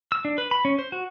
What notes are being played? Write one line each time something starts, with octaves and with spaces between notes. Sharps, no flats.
E6
D4
B4
B5
C#4
C5
F#4